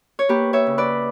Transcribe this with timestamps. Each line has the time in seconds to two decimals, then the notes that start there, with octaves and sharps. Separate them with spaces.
0.19 C#5
0.29 A#3 G4 B4
0.53 C#5 E5
0.67 C#3
0.78 B4 D5